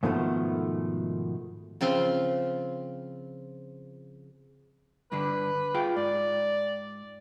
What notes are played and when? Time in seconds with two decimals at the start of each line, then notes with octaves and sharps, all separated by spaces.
0.03 G#2 B2 D#3 F3 A3
1.81 C#3 F3 C4 F4
5.12 G2 D3 D4 B4
5.74 F4 G#4 G5
5.97 G#2 D5